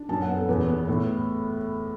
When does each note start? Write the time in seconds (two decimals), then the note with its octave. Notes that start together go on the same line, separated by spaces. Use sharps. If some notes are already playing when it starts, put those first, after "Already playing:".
Already playing: D4
0.09 F#2 A5
0.22 F#5
0.29 B3
0.35 A4
0.49 E2 B4
0.69 B3
0.88 A2